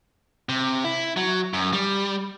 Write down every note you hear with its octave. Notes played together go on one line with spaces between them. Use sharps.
C3
E4
F#3
F#2
G3